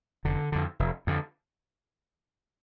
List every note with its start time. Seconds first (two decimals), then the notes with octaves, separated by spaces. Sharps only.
0.25 F1 D3
0.52 F2 D3
0.79 F1
1.07 F2 D3